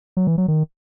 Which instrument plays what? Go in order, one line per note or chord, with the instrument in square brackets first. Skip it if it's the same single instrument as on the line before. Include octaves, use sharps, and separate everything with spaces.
[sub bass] F#3
E3
F#3
D#3